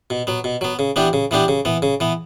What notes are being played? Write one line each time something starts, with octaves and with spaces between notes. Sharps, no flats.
B2
F#3 B3
B2
F#3 B3
C#3
E3 B3 D4 G4
C#3
E3 B3 D4 G4
C#3
E3 B3
C#3
E3 B3